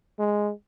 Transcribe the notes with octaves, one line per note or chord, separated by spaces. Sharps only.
G#3